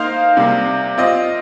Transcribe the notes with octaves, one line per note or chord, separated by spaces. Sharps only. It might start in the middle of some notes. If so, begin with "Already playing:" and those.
Already playing: A#3 D#4 C5 F5
C3 G3 A#3
C4 F4 D#5